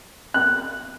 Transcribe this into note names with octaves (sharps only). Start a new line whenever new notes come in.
F#6